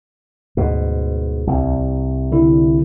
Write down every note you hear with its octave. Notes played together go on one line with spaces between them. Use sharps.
D2 G#2 B2
C2
D3 E4